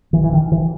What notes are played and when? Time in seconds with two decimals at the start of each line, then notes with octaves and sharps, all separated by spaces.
0.13 E3
0.24 E3
0.33 D#3
0.52 E3